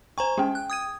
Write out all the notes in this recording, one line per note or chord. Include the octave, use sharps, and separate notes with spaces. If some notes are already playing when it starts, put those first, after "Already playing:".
C5 G#5 A#5 C#6
G#3 C#4 G#4 G5
F#6
D#6 G#6 D#7